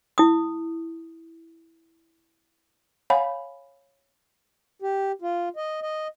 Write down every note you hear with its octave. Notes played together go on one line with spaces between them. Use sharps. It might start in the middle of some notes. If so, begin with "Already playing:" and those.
E4 D#6
C#5 F5 F#5 G#5 B5
G4
F4
D#5
D#5